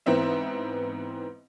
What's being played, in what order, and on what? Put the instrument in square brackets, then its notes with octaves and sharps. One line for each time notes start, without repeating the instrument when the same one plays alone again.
[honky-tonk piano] G#2 E3 B3 C4 E5